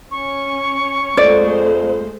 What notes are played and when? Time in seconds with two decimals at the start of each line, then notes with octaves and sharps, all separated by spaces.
0.11 C#4 C#6
1.17 F2 G#3 A3 C5 D5